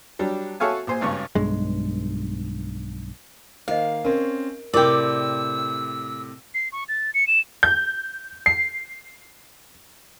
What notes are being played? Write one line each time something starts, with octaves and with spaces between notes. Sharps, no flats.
F#3 G3 D4
F#4 A4 C#5 E5 F5 G#5
A#1 C5 G#5
G#1 G2 C#3 C#6
B1 G2 G#3
D#3 A#3 C5 D#5 F5
C4 C#4 D#4 A#4
A2 C3 A#4 D5 G5 D6 E6
C7
C#6
A6
C#7
E7
G6
C7